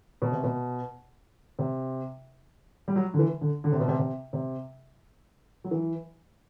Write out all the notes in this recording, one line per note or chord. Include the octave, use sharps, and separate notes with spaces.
B2
C3
B2
C3
G3
F#3
D3
E3
D3
D3
C3
B2
C3
C3
C3
F#3
E3